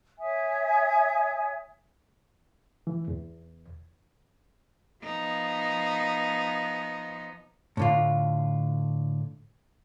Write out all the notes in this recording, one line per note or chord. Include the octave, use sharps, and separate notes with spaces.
C#5 E5 G#5 D#6
E3
E2
F3 B3 D#4
A2 D3 F4